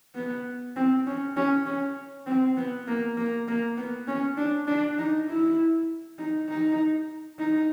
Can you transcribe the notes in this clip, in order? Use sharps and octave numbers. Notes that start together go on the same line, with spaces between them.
B3
C4
C#4
C#4
C#4
C4
B3
A#3
A#3
A#3
B3
C#4
D4
D4
D#4
E4
D#4
D#4
D#4